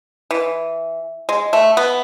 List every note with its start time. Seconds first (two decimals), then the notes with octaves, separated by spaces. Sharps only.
0.31 E3
1.29 G#3
1.53 A3
1.77 B3